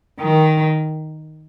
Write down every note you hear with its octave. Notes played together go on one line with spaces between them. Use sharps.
D#3